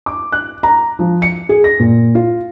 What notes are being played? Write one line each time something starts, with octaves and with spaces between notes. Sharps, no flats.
D6
F#6
A#5
F3
C#7
G#4
A#6
A#2
F4